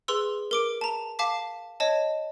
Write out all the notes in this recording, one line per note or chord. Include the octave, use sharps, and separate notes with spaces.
G#4 B4 C6 E6
A#4 D6 D7
A5 A#5
F5 A5 D6 B6
C#5 D#5 A5